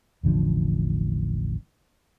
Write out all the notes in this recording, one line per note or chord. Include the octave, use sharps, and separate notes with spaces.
E1 A1 D3 F3